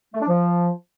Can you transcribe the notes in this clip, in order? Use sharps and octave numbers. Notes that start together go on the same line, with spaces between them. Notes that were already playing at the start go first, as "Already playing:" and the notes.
A3
D4
F3